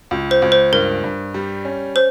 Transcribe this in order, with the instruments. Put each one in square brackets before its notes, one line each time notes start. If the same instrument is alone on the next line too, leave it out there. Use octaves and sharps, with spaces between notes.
[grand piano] C#2
[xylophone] C5
[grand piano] C#2
[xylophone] C5
[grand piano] G2 [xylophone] A#4
[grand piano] G2
G3
C#4
[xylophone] C5